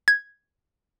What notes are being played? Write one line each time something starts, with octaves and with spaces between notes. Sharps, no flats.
G#6